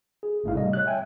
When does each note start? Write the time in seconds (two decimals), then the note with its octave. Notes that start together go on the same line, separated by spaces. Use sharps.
0.23 G#4
0.44 G1 A2 A3 D#4 E4 F5
0.55 C3 G3 D#5
0.73 C#5 F#6
0.86 E5 G5 G#5